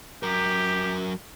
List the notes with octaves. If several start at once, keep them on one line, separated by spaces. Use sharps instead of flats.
F#3 G4 A#4